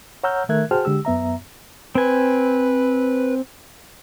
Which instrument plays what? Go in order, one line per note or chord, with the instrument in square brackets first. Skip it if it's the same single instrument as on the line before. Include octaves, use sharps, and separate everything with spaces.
[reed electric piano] C#5 F#5 A#5 E6 F6 G6
D#3 A3 A#4 E5 F#6 G#6
F#4 G#4 C5 G5 A5 F6
D3 G#3 G4 E6
F#2 B3 E5 A#5
[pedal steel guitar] C4 G#5 [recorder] B4